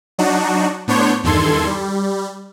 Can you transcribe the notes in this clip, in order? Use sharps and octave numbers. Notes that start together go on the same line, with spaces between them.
F#3 D4 D#4 F#4
A2 B3 D4 C5 C#5 G6
E2 G2 D#3 A4 C6 G#6
G3